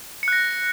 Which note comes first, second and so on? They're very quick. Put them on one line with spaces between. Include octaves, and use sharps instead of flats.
C#7 F#6 A#6